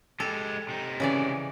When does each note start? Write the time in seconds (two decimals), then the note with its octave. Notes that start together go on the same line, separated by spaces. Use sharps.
0.20 G#3 G4 A4
0.69 C3 D#4
1.00 C#3 E3 D5